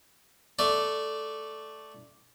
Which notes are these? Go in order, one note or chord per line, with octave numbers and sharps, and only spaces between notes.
A3 D5